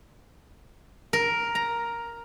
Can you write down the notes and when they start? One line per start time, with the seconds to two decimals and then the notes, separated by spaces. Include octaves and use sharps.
1.13 A#4
1.55 A#5